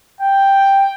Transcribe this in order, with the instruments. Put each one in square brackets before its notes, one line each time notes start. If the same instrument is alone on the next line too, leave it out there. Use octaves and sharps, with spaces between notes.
[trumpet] G5